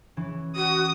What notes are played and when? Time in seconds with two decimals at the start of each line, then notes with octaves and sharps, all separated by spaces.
0.17 E3 C#4
0.56 F#4 D#6